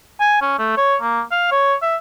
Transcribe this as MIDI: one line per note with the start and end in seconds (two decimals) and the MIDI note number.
0.20 0.39 80
0.42 0.54 61
0.59 0.72 57
0.77 0.96 73
1.01 1.21 58
1.31 1.48 77
1.51 1.74 73
1.82 1.96 76